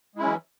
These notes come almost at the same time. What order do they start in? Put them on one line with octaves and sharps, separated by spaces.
G#3 E4 C#4 F#3 E3